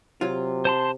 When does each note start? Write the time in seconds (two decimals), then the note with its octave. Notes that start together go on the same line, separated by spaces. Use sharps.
0.21 C3 F#3 F4
0.65 C5 A5 C6